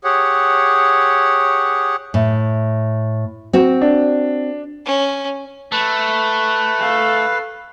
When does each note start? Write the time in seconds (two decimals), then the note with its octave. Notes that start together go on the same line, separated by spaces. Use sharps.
0.04 G4 G#4 C#5 F#5
2.14 A2
3.53 C4 F#4
3.81 D4
4.86 C#4
5.72 A3 B4
6.80 A4 F5